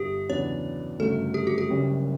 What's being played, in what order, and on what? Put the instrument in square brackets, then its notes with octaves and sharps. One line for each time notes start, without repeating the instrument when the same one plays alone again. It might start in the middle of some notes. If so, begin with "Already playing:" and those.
Already playing: [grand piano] G1 G2 D3 [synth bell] G4
[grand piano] E2 C#3 F#3 B3 D4 [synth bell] C#5
[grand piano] G1 F#2 C#3 F#3 A3 [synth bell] A4
[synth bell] G4
F#4
G4
[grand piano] F#1 F#2 C#3 G3 C#4